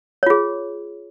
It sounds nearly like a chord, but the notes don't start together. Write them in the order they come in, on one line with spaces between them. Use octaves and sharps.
C#5 F4 G#4